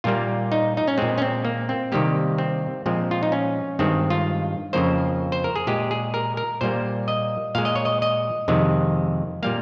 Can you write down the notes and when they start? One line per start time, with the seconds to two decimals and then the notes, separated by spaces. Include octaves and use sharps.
0.04 A#2 G3 A#3 F4
0.52 D#4
0.77 D#4
0.87 C#4
0.98 A#2 G#3 C4
1.18 C#4
1.22 C4
1.45 A#3
1.69 C4
1.92 C3 D#3 G3 A#3 G4
2.38 C4
2.86 A#2 F3 G#3 C4
3.11 F4
3.23 D#4
3.32 C#4
3.79 G2 D#3 G#3 C4
4.10 F4
4.73 F2 C#3 F3 A#3 C5
5.32 C5
5.44 A#4
5.56 G#4
5.67 A#2 G#3 G4
5.91 G#4
6.14 A#4
6.37 A#4
6.61 A#2 G3 A#3 C5
7.08 D#5
7.55 A#2 G#3 F5
7.65 D#5
7.75 C#5
7.85 D#5
8.02 D#5
8.48 F2 C3 D#3 G#3
9.43 A#2 G3 A#3 F5